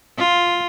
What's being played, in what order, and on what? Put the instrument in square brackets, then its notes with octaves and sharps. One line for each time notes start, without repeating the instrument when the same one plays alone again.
[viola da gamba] F4